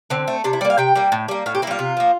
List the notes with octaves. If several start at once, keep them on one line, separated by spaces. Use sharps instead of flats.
D3 C4
A3
C3 D4
E4
G3 A#3 D5
F5
C3 G5
G3 A#3
A2
G3 A#3
A2 F5
G4
G3 A#3 E4 F4
C3
F3 A#3